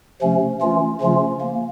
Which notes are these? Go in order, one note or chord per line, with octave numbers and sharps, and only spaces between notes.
C3 F3 A3 C#4
E3 A3 C#4 F4
C#3 F3 A3 C#4 F4
A#3